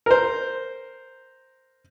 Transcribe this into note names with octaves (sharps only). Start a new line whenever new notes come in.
A#4 C5